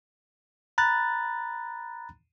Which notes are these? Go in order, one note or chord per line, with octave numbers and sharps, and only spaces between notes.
A#5 B5 F#6 A6